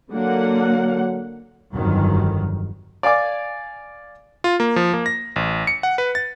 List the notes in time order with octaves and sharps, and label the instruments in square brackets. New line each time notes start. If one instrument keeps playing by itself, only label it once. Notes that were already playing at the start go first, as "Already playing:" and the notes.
[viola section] D3 A#3 F#5 [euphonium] F#3
[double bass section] G1 F2 D#3 F#3
[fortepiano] D5 F5 G#5 D6
[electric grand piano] F4
A#3
F3
A#3
A#6
A1
C#7
F#5
B4
A6